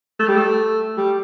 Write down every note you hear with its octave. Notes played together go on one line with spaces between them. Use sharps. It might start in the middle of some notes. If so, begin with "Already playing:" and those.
A3
G3
A3
G3